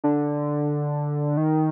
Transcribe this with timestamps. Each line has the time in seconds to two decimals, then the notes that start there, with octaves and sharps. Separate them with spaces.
0.04 D3
1.37 D#3